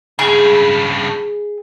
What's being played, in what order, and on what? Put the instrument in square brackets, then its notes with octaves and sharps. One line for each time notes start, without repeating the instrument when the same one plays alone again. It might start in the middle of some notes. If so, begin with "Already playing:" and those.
[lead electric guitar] G2 C#3 [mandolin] G#4